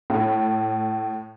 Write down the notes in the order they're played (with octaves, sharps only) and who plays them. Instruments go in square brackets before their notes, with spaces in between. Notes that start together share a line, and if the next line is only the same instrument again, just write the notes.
[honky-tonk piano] A2